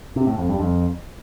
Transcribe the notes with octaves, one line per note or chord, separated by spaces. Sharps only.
C3
A2
F2
G2
F2